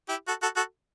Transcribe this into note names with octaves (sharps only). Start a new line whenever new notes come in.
E4 G4
F#4 A4
F#4 A4
F#4 A4